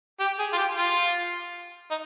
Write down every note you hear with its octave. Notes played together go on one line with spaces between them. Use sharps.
G4
G#4
F4
G4
F4
D#4